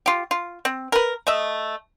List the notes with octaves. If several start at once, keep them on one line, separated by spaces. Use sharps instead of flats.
F4 G4
F4
C4
A#4 B4
A3 D#5 E5